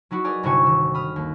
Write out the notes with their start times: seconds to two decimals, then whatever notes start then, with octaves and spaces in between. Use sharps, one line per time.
0.11 F#3 D#4 E4 F#4
0.24 G#4 A#4 B4 D5 D#5 A#5
0.43 G1 C3 E4 F#4 G#5 C#6
0.63 D#3 E6
0.94 B5 D#6 F6
1.16 D#2